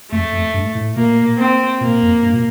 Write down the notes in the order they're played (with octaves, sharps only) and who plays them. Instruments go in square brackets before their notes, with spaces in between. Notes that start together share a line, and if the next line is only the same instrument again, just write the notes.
[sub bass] F2 [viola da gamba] A3
[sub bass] F2
G2
A2
[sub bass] A#2 [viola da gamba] A#3
[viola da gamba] C4
[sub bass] A#2 [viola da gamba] A#3
[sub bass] F2
G2
A#2